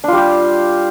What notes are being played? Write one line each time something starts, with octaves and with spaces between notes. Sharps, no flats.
G3 D4 F4 G4